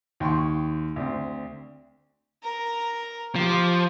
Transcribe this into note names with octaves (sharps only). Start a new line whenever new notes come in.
D#2 G5 C6 C#6
D2 C4
A#4 A#5
F3 G4 D6